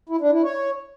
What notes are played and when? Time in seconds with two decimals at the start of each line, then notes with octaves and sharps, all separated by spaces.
0.09 E4
0.21 D4
0.32 E4
0.44 C#5